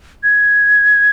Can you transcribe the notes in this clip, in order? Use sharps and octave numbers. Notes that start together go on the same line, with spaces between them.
G#6